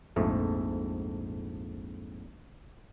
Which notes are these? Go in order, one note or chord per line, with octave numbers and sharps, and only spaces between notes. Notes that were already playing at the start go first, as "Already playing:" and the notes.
A#1 F2 G#2 A3